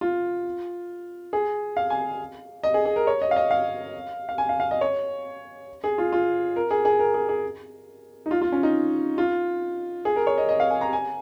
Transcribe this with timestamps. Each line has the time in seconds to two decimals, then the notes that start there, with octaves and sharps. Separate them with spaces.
0.01 F4
1.33 G#4
1.77 F5
1.90 G#5
2.63 D#5
2.74 G#4
2.85 G#4
2.96 A#4
3.07 C#5
3.22 D#5
3.31 F5
3.36 D#5
3.51 F5
4.29 F5
4.38 G#5
4.49 F5
4.60 F5
4.71 D#5
4.81 C#5
5.84 G#4
5.98 F4
6.12 F4
6.56 A#4
6.71 G#4
6.85 G#4
6.99 A#4
7.14 G#4
7.29 G#4
8.26 D#4
8.31 F4
8.41 F4
8.52 C#4
8.63 D#4
9.18 F4
10.05 G#4
10.16 A#4
10.27 C#5
10.38 D#5
10.49 D#5
10.60 F5
10.71 G#5
10.81 A#5
10.93 G#5